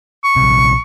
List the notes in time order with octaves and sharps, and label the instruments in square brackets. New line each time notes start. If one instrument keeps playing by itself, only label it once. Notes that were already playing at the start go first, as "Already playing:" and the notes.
[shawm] C#6
[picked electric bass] A#1 C3